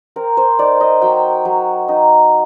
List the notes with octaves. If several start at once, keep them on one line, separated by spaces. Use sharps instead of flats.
C4 A#4
C5
D#4 D5
D#5
F#3 G5
F#3
D#4